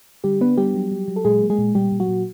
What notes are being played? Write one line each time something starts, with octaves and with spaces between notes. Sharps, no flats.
D3 G3 G4
B3 D4 B4
G3 B3 G4
F#3
F#3
F#3
A4
A#2 G#3 G#4
A#3
G#3 G#4
A#2
A#2 G3 G4
A#2
F#3 F#4
A#2